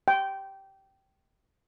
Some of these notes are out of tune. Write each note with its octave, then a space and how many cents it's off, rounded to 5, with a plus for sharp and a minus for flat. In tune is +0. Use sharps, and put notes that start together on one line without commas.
G5 -15